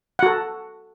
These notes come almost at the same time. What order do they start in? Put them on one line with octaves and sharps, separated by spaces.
F#5 F#4 A4